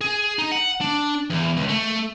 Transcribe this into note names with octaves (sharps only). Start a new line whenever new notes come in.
G#4
D#4
F#5
D4
E2
C#2
A3